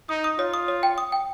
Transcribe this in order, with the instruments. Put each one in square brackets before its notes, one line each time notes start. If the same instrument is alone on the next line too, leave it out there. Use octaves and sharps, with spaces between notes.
[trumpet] D#4 [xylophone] D#6
[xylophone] D#6
[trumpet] F4 [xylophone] C#5
[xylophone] D#6
C#5
G5
D#6
G5